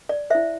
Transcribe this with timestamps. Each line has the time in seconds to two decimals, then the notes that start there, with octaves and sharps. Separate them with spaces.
0.09 D5
0.30 E4 C5 E5